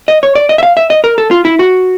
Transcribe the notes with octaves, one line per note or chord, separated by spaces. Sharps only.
D#5
C#5
D5
D#5
E5
F5
E5
D#5
A#4
A4
F4
E4
F#4